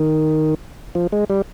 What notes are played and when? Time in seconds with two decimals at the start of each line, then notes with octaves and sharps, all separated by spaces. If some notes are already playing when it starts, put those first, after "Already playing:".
Already playing: D#3
0.95 F3
1.12 G#3
1.30 G3